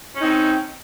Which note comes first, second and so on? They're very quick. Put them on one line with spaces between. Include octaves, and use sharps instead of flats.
C#4 D#4 C4